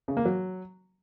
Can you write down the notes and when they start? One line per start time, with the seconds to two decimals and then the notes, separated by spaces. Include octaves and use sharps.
0.08 C#3
0.17 A#3
0.25 F#3